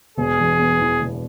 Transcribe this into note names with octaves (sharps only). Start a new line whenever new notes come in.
E1 G#4
E2
B3
E3
E1